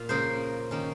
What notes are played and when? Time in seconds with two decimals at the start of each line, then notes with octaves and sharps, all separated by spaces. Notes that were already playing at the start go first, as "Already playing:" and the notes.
Already playing: A#2 F4
0.09 C#3 F3 A#3 C5
0.71 D#3 A#3 C#4